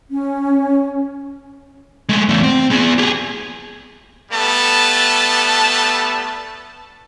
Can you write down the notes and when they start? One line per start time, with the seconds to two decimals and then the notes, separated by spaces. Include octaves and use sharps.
0.10 C#4
2.09 G#3 A3
2.29 E2 A3
2.43 C4
2.70 B3 G#4
2.98 G4 G#4
4.32 G3 A3 B3 A5